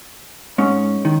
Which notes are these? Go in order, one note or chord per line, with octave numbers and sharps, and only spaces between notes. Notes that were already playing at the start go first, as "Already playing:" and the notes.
G#2 C#4
D#3